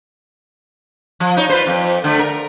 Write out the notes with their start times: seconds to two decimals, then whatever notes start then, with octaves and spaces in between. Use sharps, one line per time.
1.20 F3
1.37 D#4 C#5
1.50 F4 B4 C5
1.67 F2
2.04 D3 A3
2.19 A#4